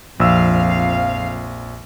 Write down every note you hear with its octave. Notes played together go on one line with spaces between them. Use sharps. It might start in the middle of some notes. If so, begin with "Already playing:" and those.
A#1 F2 F5 E6